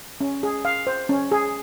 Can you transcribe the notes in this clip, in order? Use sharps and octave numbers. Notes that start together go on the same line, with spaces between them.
C#4
G#4
F5
C5
C#4
G#4